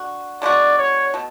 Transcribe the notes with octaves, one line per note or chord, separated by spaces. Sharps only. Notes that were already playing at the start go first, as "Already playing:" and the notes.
Already playing: D3 F#4
D3 G#3 B3 F#4 D5
C#5
B2 A3